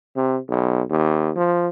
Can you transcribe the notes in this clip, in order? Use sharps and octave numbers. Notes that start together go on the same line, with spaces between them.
C3
B1
D#2
F3